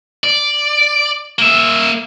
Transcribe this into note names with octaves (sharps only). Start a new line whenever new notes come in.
D5
A#3 E5